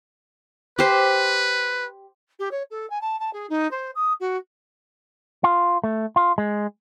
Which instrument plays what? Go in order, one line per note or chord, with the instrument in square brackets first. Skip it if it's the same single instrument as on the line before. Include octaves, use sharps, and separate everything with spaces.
[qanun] G4 C5 [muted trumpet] B4
[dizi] G4
C#5
A4
G#5
A5
A5
G#4
D#4
C5
D#6
F#4
[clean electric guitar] F4
A3
F4
G#3